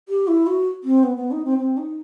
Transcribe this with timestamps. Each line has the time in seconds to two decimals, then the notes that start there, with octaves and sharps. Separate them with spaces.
0.09 G4
0.28 E4
0.47 F#4
0.84 C4
1.03 B3
1.17 B3
1.31 D#4
1.45 C4
1.58 C4
1.77 D#4